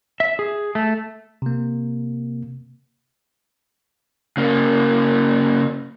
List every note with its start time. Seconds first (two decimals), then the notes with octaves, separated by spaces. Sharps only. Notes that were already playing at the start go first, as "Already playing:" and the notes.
0.20 E5
0.39 G#4
0.75 A3
1.42 C3 A#3
4.37 C#3 A#3